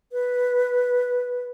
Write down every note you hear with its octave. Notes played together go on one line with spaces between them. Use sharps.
B4